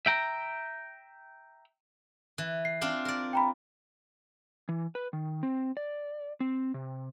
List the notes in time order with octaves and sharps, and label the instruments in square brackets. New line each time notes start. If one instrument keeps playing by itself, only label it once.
[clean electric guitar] E5 G5 A#5
[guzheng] E3
[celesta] C7
[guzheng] C4 D4 F4
A#4 D5
[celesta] G5 A#5 B5
[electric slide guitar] E3
B4
D#3
C4
D5
C4
C3